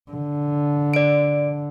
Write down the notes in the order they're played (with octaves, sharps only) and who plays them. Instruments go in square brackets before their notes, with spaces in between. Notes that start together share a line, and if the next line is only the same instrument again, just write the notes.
[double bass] D3
[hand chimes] D5 D7